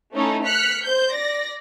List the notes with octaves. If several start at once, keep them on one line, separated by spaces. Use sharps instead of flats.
A3 C#4 D#4 E4 A4
F6 F#6 B6 C#7
C5 G6
D5 A#6